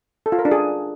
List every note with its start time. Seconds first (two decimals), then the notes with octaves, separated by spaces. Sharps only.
0.26 A4
0.32 F4
0.39 A#4
0.45 D4
0.52 G#4